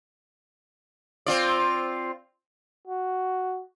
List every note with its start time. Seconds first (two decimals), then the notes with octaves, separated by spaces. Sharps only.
1.26 C4 F4 D5
2.87 F#4